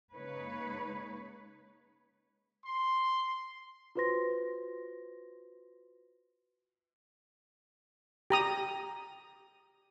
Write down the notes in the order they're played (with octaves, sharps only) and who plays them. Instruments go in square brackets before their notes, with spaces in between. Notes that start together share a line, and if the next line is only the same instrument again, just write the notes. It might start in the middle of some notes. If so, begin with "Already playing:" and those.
[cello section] C#3 G#3 A#3 D#4 B4 C#5
[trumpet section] C6
[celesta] F4 F#4 B4 C5 C6 A#6
[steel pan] G4 A#5 D#6